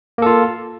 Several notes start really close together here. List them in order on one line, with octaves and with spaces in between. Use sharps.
A#3 A4 F4